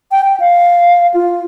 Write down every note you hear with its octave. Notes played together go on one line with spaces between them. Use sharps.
G5
G5
F5
F4